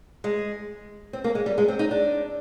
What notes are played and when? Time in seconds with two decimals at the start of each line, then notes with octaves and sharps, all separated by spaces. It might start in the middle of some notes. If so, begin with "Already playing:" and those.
0.24 G#3
1.13 C4
1.24 A#3
1.35 G#3
1.46 G3
1.58 G#3
1.68 C4
1.79 D#4
1.91 D4